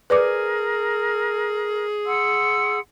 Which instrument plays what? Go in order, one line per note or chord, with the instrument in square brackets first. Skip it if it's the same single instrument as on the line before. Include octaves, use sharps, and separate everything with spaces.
[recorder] G#4 [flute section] A#4 [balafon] B4 D5 D6
[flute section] F#5 C6 E6